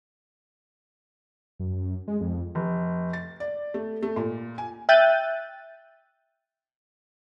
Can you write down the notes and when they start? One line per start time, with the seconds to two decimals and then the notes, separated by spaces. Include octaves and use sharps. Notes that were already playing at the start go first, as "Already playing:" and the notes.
1.60 F#2
2.08 G#3
2.21 F2
2.55 F1
3.13 A6
3.40 D5
3.74 A3
4.03 A3
4.16 A#2
4.58 G#5
4.89 E5 G5 F#6 G6 A6 D#7